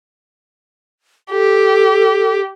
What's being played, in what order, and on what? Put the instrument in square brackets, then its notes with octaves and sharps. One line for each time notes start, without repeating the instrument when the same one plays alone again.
[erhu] G4 [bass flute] A4